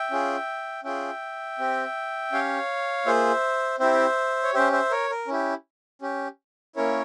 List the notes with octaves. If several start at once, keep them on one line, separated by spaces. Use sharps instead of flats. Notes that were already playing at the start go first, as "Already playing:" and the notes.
Already playing: E5 G5
C#4 F4 G#4
C#4 F4 G#4 E5 G5
C4 G4
C#4 G4 C#5 F5
A#3 F4 G#4 C5 E5
C4 E4 G4 C5 E5
C#5
C#4 G4 C5 E5
C5 E5
A#4 C#5
A#4
C#4 E4 G4
C#4 G4
A#3 C#4 E4 A#4 C#5